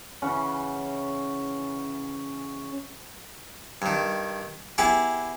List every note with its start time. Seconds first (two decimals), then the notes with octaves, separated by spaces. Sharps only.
0.22 C#3 E3 C#4 F#5
3.82 G2 D#3
4.78 B3 E4 G4 G#4